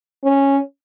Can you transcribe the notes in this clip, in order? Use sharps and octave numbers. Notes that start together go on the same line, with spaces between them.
C#4